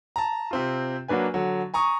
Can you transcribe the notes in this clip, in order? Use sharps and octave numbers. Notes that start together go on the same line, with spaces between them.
A5 A#5
C3 C4 F4
F#3 A#3 D4 B4 G#5
D3 F#3
G#5 A#5 C#6 D#6